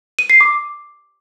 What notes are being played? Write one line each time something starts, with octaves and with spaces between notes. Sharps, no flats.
D#7
C7
D6